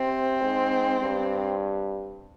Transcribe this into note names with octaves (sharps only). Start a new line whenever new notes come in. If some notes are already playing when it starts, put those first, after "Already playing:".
Already playing: C3 C4
G#2
G2